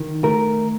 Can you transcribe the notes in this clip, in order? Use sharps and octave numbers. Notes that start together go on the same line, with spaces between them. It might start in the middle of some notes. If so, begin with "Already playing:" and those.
Already playing: D#3
A3 A#4